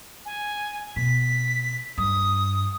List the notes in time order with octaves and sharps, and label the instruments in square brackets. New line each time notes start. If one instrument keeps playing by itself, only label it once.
[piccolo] G#5
[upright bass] B2 [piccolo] B6
[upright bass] G2 [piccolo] D#6